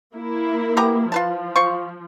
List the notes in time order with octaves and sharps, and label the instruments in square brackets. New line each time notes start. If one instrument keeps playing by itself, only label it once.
[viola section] A#3 E4
[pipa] B3 G4 A#5
[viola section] F3 [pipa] F4 B4 A5
[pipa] F4 C5 C#6